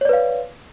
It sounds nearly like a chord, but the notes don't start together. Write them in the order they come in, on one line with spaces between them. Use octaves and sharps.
C#5 D5 B4 F5